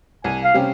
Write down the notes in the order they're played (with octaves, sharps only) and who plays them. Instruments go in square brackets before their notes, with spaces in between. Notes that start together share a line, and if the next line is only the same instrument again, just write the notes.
[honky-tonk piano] C2 [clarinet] G#5
[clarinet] F5
[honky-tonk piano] C3 G3 C#4 G4